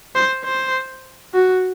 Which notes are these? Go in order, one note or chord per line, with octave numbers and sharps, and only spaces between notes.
C5
C5
F#4